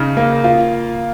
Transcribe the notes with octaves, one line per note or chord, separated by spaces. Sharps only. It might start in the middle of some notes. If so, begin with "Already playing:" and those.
Already playing: C#3 D#4
A#3
F4